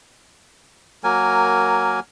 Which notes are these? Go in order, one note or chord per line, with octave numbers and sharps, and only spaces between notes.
F#3 A#3 A#4 G#5